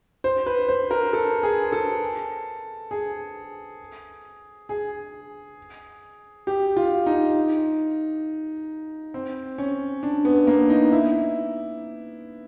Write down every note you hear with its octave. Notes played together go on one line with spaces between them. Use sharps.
C5
B4
C5
A#4
A4
G#4
A4
G#4
G#4
G4
F4
D#4
C4
C#4
D4
B3
A#3
D#4
E4